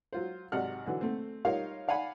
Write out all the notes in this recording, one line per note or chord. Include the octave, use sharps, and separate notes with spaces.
F#3 F4 C5
G#1 C3 F#3 D5 F#5 F6
D3 E3 F#3
A3 C4
G3 D#4 F4 A#4 C#5 F5
D5 F5 F#5 G#5 B5